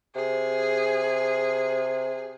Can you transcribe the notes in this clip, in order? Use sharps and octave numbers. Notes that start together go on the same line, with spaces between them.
C3 G#4